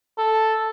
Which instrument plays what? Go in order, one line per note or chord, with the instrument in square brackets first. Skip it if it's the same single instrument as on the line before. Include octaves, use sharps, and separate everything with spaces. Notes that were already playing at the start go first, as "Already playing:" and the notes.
[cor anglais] A4